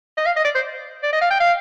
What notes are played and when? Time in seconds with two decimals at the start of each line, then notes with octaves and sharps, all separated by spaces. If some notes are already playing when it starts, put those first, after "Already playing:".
0.17 D#5
0.26 F5
0.36 D#5
0.45 D5
0.55 C5
1.03 D5
1.13 D#5
1.21 F5
1.31 G5
1.40 F5